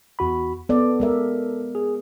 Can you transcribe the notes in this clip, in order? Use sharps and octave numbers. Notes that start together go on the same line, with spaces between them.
E2 F#4 B5
B3 A4 D5
G#3 A#4 E5
G#4